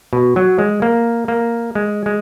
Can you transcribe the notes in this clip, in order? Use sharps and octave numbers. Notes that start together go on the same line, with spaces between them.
B2
F#3
G#3
A#3
A#3
G#3
G#3